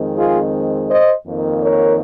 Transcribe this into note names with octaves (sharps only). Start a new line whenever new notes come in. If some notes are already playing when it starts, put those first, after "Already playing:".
Already playing: F2 D#3 G#3 C4
F4 G#4
C5 D#5
F2 D#3 A#3
A#4 C#5